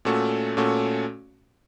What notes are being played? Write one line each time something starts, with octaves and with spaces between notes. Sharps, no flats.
A#2 A3 C#4 F#4 A4
A#2 A3 C#4 F#4 A4